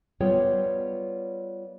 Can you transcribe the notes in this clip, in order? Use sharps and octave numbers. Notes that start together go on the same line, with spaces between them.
G3 B3 F4 G#4 C#5 G5